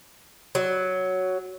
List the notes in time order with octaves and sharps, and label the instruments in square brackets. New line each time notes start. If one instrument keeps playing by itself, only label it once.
[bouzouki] F#3